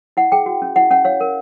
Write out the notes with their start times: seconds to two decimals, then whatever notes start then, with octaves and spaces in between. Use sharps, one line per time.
0.17 E4 F#5
0.32 G#4 G5
0.46 F#4
0.62 C#4
0.76 E4 F#5
0.91 C#4 F#5
1.05 C#5 F5
1.21 A#4